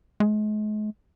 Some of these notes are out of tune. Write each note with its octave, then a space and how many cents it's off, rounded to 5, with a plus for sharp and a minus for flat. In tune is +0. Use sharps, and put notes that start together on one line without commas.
G#3 +40